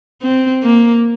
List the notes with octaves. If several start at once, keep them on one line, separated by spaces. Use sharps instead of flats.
C4
A#3